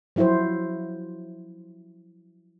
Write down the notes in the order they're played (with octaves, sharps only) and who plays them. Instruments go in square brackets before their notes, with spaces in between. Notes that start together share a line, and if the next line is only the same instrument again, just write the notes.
[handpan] F3 F#3 E4 F#4 C5